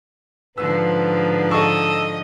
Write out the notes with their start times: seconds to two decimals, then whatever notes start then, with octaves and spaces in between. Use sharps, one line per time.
0.58 G#2 D3 F3 B4 E6
1.51 A4 D#5 C#6 E6